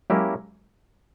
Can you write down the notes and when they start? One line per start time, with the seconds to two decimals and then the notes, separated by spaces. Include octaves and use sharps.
0.10 F#3 G#3 A#3 C#4 E4 G4 A#4